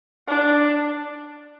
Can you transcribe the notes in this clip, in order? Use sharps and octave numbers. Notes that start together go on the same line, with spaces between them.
D4